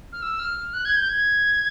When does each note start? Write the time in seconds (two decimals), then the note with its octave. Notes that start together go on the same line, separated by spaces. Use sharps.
0.13 F6
0.22 E6
0.39 F6
0.73 F#6
0.85 G#6
0.96 G6
1.09 G#6